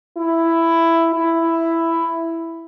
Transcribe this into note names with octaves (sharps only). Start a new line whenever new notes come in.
E4
E4